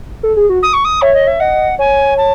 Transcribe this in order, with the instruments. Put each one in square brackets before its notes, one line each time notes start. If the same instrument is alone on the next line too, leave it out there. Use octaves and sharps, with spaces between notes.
[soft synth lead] A4
G#4
F#4
[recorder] D#6
C#6
D#6
[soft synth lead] C#5 [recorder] E5
[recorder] D#5
E5
[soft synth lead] D#5 [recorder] F#5
[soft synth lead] C#5 [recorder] G#5
[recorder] A5